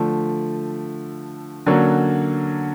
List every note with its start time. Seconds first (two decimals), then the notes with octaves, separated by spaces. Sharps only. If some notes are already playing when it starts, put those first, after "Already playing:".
Already playing: D3 F3 A3
1.66 D3 F#3 A#3 C#4 F#4